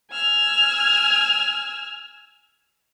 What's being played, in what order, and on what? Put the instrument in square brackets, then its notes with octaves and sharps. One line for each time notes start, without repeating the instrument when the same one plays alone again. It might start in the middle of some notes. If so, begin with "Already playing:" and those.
[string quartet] G#5 E6 F6